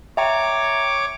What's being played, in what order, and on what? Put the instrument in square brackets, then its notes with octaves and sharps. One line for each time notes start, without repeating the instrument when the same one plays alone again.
[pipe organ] C#5 D6 [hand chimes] E5 G5 A#5